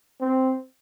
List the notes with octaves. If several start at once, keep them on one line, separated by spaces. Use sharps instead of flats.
C4